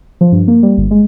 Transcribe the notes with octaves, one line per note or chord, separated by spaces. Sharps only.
F3
G2
A#3
G3
G1
G#3